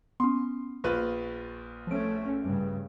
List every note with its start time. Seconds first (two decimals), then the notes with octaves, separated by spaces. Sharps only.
0.20 B3 C#4 C6
0.84 A#1 F4 B4 C#6
1.87 F3 A3 C#4 D7
2.43 G2 C#3